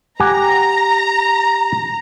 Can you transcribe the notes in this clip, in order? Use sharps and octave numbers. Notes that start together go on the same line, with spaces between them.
G4 F#5 G#5 A#5